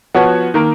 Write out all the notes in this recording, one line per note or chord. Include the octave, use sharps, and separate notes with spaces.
F3 B3 F#4 C#5
D#3 A#3